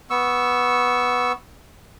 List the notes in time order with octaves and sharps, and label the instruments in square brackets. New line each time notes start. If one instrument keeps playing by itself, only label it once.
[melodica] B3 C#6 E6